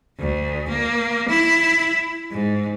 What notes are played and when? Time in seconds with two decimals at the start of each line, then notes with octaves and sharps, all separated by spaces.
0.19 D2
0.69 A#3
1.29 E4
2.31 G#2